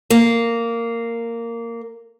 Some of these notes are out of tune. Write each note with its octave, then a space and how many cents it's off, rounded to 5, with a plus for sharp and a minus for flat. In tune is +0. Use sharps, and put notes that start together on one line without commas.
A#3 -10